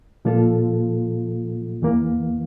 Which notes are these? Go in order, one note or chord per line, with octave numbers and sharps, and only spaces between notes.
A#2 F3 A#3 F4 A4
E2 E3 A#3